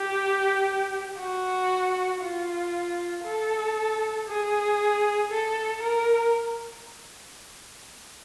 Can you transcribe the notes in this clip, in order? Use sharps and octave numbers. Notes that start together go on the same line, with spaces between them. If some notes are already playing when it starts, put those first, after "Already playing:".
Already playing: G4
F#4
F4
A4
G#4
A4
A#4